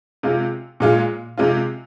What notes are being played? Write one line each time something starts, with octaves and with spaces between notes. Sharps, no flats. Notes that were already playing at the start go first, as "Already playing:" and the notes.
C3 G#3 F4
A#2 G#3 F4
C3 G#3 F4